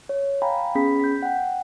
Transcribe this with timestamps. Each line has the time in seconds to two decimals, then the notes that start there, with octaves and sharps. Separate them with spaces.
0.09 C#5
0.42 F5 G5 G#5 A#5 B5
0.75 B3 C#4 G#4 B5 B6
1.00 G6 B6
1.23 F#5 G5